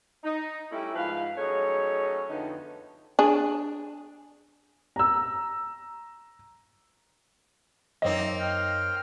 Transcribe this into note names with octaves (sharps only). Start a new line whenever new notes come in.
D#4
G3 A3 C#4 E4
G#2 F3 B4 F5
F#3 A3 C#4 D#4 G#4 C#5
F2 D3 A3 B3 D#4
D4 G#4
A#5 E6
F#2 A#3 C4 D#4 C#5 D#5
G5 F6